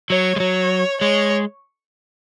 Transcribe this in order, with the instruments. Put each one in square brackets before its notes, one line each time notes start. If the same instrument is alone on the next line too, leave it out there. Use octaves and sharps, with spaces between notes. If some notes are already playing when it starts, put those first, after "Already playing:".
[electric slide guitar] F#3 [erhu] C#5
[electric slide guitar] G#3
[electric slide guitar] F#3 [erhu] C#5
[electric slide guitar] G#3 [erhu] C#5